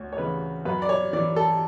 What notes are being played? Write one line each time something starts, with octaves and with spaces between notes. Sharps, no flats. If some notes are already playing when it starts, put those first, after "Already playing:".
Already playing: D2 C#5
C#5
C#3 E3 B4
F#2 B4
D5
C#5
E3 D5
A4